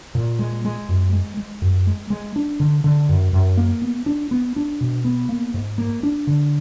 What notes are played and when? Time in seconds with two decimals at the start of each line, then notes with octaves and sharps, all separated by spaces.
0.15 A#2
0.39 G#3
0.65 G#3
0.89 F#2
1.12 G#3
1.37 G#3
1.62 F#2
1.87 G#3
2.10 G#3
2.36 D4
2.60 D3
2.84 D3
3.09 F#2
3.33 F#2
3.57 A#3
3.82 B3
4.06 D4
4.31 B3
4.56 D4
4.81 B2
5.05 B3
5.29 A#3
5.54 G#2
5.78 A#3
6.03 D4
6.27 D3